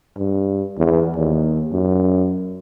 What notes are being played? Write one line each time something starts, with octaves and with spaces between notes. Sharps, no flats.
G2
E2
D#2
F#2